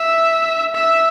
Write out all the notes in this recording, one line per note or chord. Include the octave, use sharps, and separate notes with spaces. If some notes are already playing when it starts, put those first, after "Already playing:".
Already playing: E5
E5